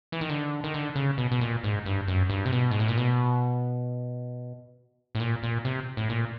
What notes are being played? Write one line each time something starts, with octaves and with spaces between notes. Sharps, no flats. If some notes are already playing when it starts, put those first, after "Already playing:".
E3
D#3
D3
D#3
D3
C#3
B2
B2
A#2
G#2
G2
F#2
G2
C3
B2
G#2
A2
A#2
B2
A2
A#2
A#2
C3
A2
A#2